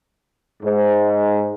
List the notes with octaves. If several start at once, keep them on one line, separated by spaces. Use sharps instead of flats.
G#2